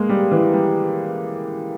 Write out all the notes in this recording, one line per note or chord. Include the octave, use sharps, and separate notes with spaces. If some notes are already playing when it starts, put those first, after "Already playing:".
Already playing: G#3 A#3
G3
E3
G3